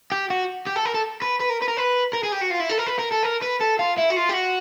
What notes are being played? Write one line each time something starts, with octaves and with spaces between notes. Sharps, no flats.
G4
F#4
G4
A4
A#4
A4
B4
B4
A#4
B4
A#4
B4
A#4
G#4
G4
F#4
F4
E4
A4
A#4
B4
A#4
A4
A#4
B4
A4
F4
E4
F#4
F4
G4
F#4